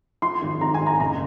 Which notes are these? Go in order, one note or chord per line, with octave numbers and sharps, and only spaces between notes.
F3 C6
G#1
G#1 A#5
G#5
G#1
A#5
F#1 A#5